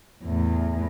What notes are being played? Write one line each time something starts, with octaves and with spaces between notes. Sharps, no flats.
E2 A2